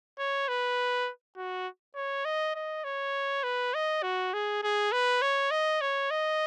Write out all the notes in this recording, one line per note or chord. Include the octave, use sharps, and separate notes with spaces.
C#5
B4
F#4
C#5
D#5
D#5
C#5
B4
D#5
F#4
G#4
G#4
B4
C#5
D#5
C#5
D#5